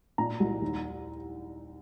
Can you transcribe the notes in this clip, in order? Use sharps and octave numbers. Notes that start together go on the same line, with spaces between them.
A#2 A#5
C2
D#2